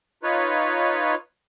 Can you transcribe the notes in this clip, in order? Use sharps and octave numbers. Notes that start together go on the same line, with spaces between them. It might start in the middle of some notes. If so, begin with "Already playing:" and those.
D#4 F4 B4 C#5